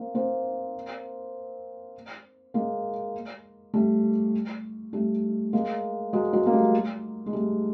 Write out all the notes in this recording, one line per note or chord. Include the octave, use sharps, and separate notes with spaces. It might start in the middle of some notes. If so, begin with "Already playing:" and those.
Already playing: A#3 C4
A#3 C4
G#3 A#3
G3 A3
G3 A3
G#3 A#3
F#3 G#3
F#3 G#3
A#3
G3 A3
G#3
G3 A3